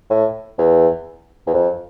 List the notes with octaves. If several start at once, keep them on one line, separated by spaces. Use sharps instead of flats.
A2
E2
E2
F2